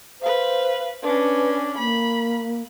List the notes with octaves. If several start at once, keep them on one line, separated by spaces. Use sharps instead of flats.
B4 C5 F5
C#4 D4 B4
A#3 B5